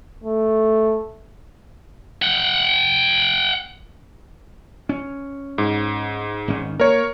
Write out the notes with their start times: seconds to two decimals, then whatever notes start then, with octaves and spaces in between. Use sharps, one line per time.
0.24 A3
2.22 F#5 G5
4.89 C#4
5.58 G#2
6.48 G#1 D#3 C#4
6.80 A#3 A#4 C#5